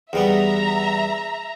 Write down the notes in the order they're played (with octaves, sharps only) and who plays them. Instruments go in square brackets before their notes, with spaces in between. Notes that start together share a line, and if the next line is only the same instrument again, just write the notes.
[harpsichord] E2 G3 B3 [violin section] E5 A#5